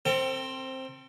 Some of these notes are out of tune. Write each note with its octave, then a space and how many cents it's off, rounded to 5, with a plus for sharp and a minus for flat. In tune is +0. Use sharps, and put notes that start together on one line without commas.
C4 +10 A4 +45 G5 +0